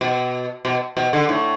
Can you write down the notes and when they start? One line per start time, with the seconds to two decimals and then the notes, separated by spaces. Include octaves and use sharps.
0.01 B2
0.65 B2
0.97 B2
1.13 D3
1.29 A2